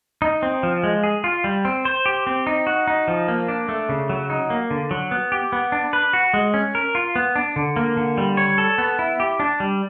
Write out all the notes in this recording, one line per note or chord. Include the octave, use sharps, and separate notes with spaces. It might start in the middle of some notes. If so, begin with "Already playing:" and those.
D#4
C4
F3
G#3
G#4
F4
G3
C4
C5
G4
C4
D#4
F#4
D#4
F3
A#3
D4
A3
C#3
F#3
D#4
A#3
D3
F#3
B3
G4
B3
D4
B4
F#4
G#3
C#4
A#4
F4
B3
D4
D3
A#3
D3
G3
C#5
A4
B3
E4
G4
D4
G3